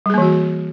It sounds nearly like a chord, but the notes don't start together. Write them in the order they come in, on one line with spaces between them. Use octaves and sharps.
G3 G#4 A#3 E3 F#4